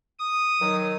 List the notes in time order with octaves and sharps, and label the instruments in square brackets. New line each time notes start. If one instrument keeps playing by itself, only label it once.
[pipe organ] D#6
[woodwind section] D#3 F#3